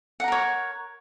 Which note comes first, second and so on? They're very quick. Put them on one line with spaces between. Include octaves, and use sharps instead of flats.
F#5 A#5 A#4 C#5